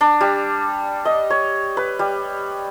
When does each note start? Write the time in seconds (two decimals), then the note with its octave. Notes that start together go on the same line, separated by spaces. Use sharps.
0.01 D4
0.21 G3
1.05 D#5
1.30 C#5
1.77 B4
1.99 G3